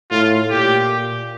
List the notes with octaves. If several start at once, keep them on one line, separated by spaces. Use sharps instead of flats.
A2 F4
A#2 G4